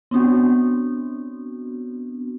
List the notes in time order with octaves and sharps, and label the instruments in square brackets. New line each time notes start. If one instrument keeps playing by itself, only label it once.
[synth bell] B3 C4 D4 F#4